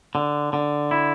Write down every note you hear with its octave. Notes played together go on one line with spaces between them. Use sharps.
D3
D3
E4